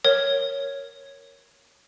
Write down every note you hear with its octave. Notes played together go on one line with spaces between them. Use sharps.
A#4 C#5 G#6